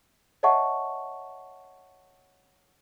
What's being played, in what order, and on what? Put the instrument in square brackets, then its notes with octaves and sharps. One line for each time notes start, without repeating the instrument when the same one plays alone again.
[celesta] C#5 D#5 E5 F#5 A5 C#6